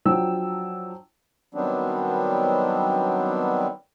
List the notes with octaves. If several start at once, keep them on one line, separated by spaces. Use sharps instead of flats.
F3 F#3 D4 G5 E6
D#3 F#3 G3 B3 C4 D4